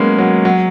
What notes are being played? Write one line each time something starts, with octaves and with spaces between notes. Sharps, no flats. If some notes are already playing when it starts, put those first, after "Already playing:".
Already playing: F#3 G#3 A#3 B3 C#4
F#3
F#3